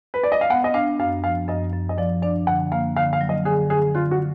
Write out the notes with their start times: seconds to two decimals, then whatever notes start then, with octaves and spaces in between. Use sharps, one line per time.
0.14 B4
0.23 D5
0.32 D#5
0.41 F5
0.50 B3 F#5
0.64 D#5
0.74 D4 F5
0.99 F#2 F5
1.24 F3 F5
1.49 F#2 D#5
1.73 F#2
1.89 D#5
1.98 F3 D5
2.22 D4 D5
2.47 D3 F#5
2.72 A#3 F5
2.96 D3 F5
3.13 F5
3.21 F#3
3.29 D#5
3.45 D3 G#4
3.70 D3 G#4
3.95 D3 F4
4.11 F#4